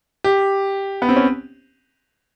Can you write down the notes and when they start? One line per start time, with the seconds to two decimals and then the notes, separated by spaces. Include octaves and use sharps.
0.24 G4
1.02 B3
1.09 C4
1.16 C#4